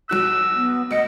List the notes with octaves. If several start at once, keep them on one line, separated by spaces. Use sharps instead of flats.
B1 F#4 E6 F#6
B3
D2 D#5 C#7